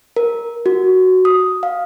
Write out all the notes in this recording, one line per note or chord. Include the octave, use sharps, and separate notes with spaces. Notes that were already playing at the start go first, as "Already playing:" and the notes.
A#4
F#4
D#6
F5